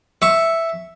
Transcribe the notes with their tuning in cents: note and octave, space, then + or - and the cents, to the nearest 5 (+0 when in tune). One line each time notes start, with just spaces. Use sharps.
E5 +0 C#6 +0